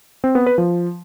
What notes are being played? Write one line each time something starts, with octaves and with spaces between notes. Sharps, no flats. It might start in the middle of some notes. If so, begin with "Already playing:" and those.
C4
B3
B4
F3